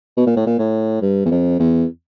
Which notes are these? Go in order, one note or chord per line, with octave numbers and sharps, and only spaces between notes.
B2
A#2
A2
A#2
A2
G2
E2
F2
E2